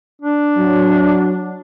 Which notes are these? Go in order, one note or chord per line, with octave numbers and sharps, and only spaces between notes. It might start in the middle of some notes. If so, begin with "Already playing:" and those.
D4
F#3